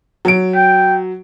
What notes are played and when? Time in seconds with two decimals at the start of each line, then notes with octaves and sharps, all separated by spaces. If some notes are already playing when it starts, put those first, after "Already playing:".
0.25 F#3 D7
0.55 G5